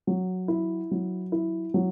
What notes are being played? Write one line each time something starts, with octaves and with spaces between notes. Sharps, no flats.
F#3
E4
F#3
E4
F#3